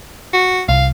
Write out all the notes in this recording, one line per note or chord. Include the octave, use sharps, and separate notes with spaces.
F#4
C2 F5